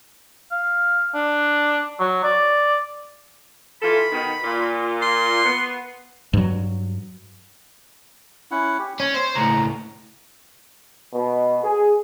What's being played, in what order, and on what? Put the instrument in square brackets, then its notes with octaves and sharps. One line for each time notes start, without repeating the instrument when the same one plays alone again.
[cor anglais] F5
D4
F#3
D5
[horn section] E3 F4 A4 [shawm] B5
[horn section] B2 D#3
A#2 F4
[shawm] C6
[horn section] B3
[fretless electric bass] G2 F#3
[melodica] C#4 E4 F#5
G4
[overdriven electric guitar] C#4 [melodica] C#5
[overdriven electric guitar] C5
[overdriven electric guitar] C#2 A2 [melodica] A#5
[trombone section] B2
G#4